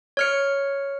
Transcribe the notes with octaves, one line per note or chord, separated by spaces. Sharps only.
C#5 F6 C#7